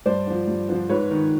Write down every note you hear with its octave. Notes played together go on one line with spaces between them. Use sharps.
G2 C5 D5
D3 F3
G2
D3 F3
G#2 B4 C#5
D#3